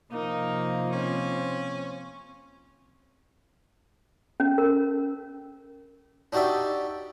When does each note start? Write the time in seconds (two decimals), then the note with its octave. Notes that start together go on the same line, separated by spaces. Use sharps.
0.12 C3 F3 A#3 D#4 A#4
0.93 C4 C#4
4.40 C#4
4.58 A#4
6.33 D4 D#4 F#4 G4 D5 E5